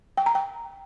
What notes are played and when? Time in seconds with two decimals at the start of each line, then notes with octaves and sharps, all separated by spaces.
0.17 G5
0.26 A#5
0.35 G5